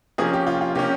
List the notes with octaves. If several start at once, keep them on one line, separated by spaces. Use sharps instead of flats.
C3 F3 A#3 C#4 G#4
G4
F4
F4
C3 F3 A#3 C#4 G4